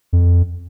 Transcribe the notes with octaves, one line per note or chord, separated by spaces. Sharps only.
F2